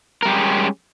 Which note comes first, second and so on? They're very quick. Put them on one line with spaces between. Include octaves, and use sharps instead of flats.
A#4 G3 G4 G#3 C#4